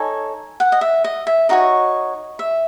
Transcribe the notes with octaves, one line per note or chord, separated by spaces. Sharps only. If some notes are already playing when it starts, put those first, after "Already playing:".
Already playing: D#4 A4 C#5 G#5
F#5
D#5
E5
D#5
E5
D#4 F#4 C#5 D#5
E5